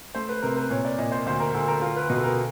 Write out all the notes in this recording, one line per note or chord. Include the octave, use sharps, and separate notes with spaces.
A3 C5
B4
C3 A#4
B4
A#2 C#5
D5
A#2 D#5
C5
D2 C5
A#4
D2 A4
A#4
F4 A#4
B4
B2 B4
A4
A#4